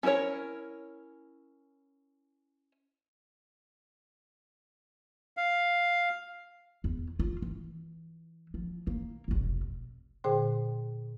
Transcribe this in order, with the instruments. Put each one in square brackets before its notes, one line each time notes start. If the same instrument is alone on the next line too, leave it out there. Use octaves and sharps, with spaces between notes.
[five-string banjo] C#4 E4 A4 A#4 C#5
[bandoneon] F5
[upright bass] E2
F4
E3
F3
A#3
F1 B1
[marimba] A#2 D3 G#4 C5 G5 C6